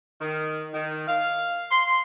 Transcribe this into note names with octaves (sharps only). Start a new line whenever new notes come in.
D#3
D#3
F5
C6